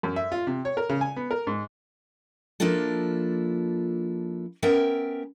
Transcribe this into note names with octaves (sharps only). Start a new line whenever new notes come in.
F#2
E5
F4
C3
C#5
A#4
C#3
G#5
B3
A#4
G#2
F3 A#3 D4 E4 F4 A4
B3 C#4 A#4 E5 G5